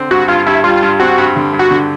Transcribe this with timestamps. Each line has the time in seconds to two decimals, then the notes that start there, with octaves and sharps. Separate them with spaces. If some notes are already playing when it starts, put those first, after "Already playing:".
Already playing: D3 C4
0.11 G2 F#4
0.28 G2 F4
0.47 G2 E4
0.64 G3 F4
0.83 G2
1.00 C4 F#4
1.18 G2
1.36 D3
1.53 G2
1.59 F#4
1.71 D3